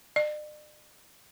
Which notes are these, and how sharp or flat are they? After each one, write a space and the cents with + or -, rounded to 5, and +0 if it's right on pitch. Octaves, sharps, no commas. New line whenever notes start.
D5 +45